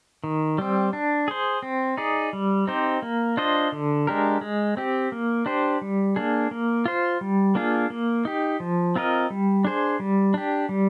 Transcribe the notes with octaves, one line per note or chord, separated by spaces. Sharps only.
D#3
G3 C4
D4
G#4 C5
C4
D#4 G#4 D5
G3
C4 D#4 G4 C5
A#3
D4 F4 C5 D#5
D3
G#3 D4 G4 A#4
G#3
C4 G4
A#3
D4 G4 C5
G3
A#3 D4 G#4
A#3
F4 C5
G3
A#3 D4 F4 G#4
A#3
D#4 G4
F3
C4 F4 A#4 D#5
G3
D4 G#4 C5
G3
D4 G4
G3